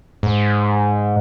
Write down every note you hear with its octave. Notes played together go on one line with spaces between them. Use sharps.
G#2